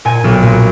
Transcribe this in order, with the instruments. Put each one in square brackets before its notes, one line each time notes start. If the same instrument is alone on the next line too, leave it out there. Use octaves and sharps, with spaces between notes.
[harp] A#2 G#5
B1
A#2